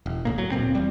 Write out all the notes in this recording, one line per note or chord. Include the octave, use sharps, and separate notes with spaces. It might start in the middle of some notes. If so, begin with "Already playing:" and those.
E1
C#2 A2 A#3
F#3
D1 A#2 C4
E2 G3